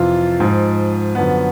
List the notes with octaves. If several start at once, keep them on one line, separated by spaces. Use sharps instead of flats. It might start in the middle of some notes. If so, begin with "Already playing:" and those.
Already playing: F2 C3 E3 F4
G#2 F3
F#2 D3 F3 B3